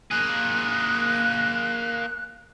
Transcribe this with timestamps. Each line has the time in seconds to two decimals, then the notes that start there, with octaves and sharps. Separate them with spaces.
0.11 A#3 G#4 F#6